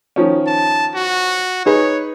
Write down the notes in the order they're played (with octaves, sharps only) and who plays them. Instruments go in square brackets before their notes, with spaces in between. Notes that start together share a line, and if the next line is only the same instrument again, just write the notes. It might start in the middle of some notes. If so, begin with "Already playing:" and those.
[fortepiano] D#3 F3 C#4
[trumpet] A5
F#4
[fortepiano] D#4 G#4 B4 [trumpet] C#5